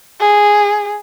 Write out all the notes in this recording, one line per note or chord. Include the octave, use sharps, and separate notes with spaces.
G#4